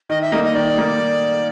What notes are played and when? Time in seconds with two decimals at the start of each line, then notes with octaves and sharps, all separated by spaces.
0.10 D#3 D#5
0.22 E5
0.32 G3 A#3 D#4 D#5
0.44 D#5
0.55 D#3 D5
0.77 G3 A#3 D#4